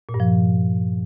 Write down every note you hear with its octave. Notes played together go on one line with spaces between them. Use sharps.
A#2
G2
F3